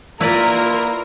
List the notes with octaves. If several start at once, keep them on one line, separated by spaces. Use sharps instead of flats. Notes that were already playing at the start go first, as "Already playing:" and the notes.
A#3 E4 F4 A#4 B4 D5